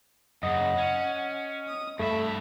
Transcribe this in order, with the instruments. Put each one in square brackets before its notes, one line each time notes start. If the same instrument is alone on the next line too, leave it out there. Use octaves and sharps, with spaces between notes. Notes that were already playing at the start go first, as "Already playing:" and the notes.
[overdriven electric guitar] F#2 C#3 [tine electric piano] D#5 [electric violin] F#5
[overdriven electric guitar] C#4
[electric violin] D#6
[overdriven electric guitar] G2 E5 [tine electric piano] A3 [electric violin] A5 B5